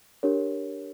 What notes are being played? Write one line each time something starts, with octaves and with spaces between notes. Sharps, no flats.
D4 G4 A#4 C#5